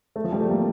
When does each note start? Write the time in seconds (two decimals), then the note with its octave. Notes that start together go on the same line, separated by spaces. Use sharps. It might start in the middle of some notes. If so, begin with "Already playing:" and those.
0.16 A3
0.24 F3
0.32 G3
0.41 A3
0.49 A#3